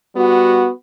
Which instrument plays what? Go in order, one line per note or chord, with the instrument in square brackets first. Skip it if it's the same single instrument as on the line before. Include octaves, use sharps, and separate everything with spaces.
[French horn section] G3 B3 F#4